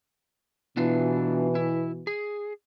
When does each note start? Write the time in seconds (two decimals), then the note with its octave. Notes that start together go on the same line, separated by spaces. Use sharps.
0.77 B2 E3 B3 D4 F4
1.55 E4
2.07 G#4